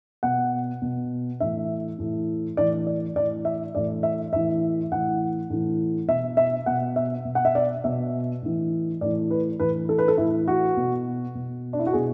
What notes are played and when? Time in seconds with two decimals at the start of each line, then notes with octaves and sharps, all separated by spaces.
0.23 B2 F#5
0.82 B2
1.40 A2 E3 E5
1.98 A2 E3
2.57 A2 E3 D5
2.87 D5
3.15 A2 E3 D5
3.45 E5
3.75 A2 E3 D5
4.03 E5
4.33 A2 E3 E5
4.91 A2 E3 F#5
5.50 A2 E3
6.08 B2 E5
6.37 E5
6.66 B2 F#5
6.96 E5
7.25 B2
7.35 F#5
7.45 E5
7.55 D5
7.84 B2 E5
8.42 A2 E3
9.01 A2 E3 D5
9.31 B4
9.60 A2 E3 B4
9.89 A4
9.98 B4
10.08 A4
10.18 A2 E3 E4
10.48 F#4
10.77 B2
11.35 B2
11.73 D4
11.79 E4
11.87 F#4
11.93 B2 G#4